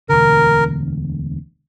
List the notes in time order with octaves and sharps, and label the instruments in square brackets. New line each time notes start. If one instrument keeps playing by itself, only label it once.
[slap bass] E1 D2 D3 [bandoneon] A#4